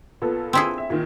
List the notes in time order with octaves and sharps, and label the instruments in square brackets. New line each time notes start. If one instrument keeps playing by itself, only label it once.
[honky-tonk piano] A#2 B3 A4
[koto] C4 E4 G#4
[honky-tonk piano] E5
A#2 D#3